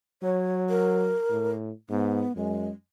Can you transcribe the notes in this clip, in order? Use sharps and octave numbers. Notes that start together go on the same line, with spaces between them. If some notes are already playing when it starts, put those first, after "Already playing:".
F#3 C#5
A#4
A2
G#2 B3
F#2 G#3